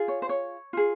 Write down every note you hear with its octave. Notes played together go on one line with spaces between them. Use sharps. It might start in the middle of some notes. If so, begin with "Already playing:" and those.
Already playing: F4 G#4
C#5
C5
C#5
F4 G#4